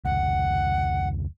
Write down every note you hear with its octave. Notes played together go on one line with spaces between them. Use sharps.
F1 C#2 F#5